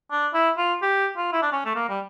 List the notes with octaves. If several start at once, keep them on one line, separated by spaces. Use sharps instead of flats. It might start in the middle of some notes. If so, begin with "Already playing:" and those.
D4
E4
F4
G4
F4
E4
D4
C#4
A3
A#3
G3